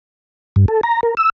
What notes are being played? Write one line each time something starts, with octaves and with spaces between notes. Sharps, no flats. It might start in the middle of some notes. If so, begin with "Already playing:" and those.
G2
A4
A#5
A#4
E6